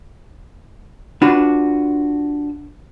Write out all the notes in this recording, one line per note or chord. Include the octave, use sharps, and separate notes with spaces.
D4 F4 F#4 B4